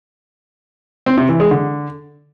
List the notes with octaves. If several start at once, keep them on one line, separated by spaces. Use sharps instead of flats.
C4
C3
E3
G#3
D3